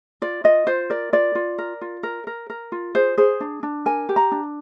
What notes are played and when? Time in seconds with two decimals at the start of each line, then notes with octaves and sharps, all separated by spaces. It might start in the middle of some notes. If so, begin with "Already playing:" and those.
0.22 F4 D5
0.44 F4 D#5
0.67 F4 C5
0.90 A#4 D5
1.13 F4 D5
1.35 F4
1.58 A#4
1.81 F4
2.03 A#4
2.27 A#4
2.50 A#4
2.72 F4
2.95 G#4 C5
3.17 G#4 C5
3.40 D4
3.63 D4
3.86 A#4 G#5
4.09 G4
4.16 A#5
4.32 D4